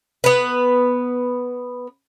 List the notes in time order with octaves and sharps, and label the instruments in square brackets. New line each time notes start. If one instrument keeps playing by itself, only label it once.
[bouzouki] B3 B4